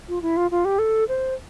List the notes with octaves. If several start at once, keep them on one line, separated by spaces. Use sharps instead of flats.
F4
E4
F4
F4
G4
A4
C5